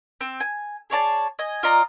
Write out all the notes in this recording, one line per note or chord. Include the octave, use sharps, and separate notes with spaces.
C4
G#5
G#4 C#5 D5 A5
D#5 G#5
F4 D5 D#5 A#5